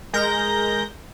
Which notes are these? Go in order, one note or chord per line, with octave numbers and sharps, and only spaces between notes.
G#3 A#4 G6 A#6